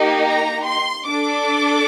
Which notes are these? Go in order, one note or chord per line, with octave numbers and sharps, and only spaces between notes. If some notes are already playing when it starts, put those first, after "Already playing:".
Already playing: A#3 D#4 G4
A#5
C6
D4 A4 D6